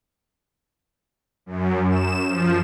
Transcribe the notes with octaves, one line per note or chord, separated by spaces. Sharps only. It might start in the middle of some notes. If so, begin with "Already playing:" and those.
F#2
E7
F3